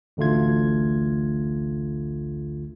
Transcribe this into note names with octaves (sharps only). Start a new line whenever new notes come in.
A1 D2 D3 A3 F4 G#6